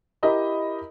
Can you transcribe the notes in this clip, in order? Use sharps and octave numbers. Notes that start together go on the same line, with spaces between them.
E4 G4 A#4 D#5 A#5 B5